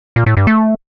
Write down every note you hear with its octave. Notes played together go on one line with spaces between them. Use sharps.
A#2
A2
G2
A3